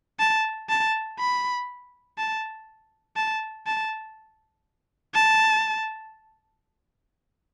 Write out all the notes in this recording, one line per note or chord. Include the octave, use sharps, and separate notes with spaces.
A5
A5
B5
A5
A5
A5
A5